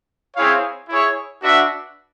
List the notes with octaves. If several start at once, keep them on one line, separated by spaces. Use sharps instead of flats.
C4 E4 G#4 C#5 F5
E4 G#4 C#5
D4 F#4 B4 E5